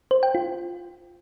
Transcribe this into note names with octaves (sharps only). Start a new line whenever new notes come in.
C5
G5
F4